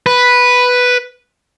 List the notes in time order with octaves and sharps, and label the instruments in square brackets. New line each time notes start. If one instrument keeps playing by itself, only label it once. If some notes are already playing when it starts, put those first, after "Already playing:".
[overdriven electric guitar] B4